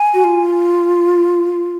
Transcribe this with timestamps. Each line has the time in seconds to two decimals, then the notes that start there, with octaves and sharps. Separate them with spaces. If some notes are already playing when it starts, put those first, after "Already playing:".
Already playing: G#5
0.14 F#4
0.24 F4